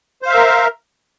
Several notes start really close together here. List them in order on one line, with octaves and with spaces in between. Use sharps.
C5 F5 E5 A#4